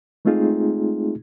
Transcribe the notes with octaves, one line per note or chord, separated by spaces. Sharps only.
G#3 A3 C4 D#4 F4 G#4